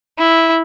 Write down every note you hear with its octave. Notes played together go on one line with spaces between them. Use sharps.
E4